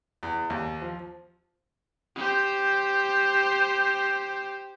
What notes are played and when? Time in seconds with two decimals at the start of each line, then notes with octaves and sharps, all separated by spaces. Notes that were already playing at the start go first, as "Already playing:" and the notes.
0.23 E2
0.50 D#2
0.82 F3
2.15 G4 C5